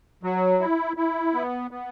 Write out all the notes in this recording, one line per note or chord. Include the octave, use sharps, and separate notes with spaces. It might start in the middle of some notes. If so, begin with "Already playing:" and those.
F#3
E4
E4
B3
B3